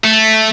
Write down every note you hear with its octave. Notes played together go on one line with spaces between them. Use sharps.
A3